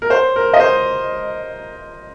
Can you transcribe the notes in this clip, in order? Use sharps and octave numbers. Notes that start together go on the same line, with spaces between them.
A#4
C5
A#4
D#5
C5